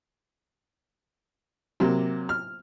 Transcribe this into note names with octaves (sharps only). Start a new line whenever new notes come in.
C3 F#3 A#3
F6